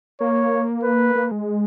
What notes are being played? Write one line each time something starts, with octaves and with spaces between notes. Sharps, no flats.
A#3 C#5
B4
A#3
G#3